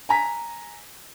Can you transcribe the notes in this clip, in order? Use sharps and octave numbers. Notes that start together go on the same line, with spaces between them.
G#5 A#5 B6